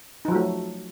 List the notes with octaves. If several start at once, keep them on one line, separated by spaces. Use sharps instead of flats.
F3 F#3 A3 D#4